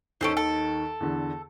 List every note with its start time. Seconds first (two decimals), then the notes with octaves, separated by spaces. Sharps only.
0.21 D#2 D#3 C#4 A4 C5 D7
0.37 A4
1.00 E2 D3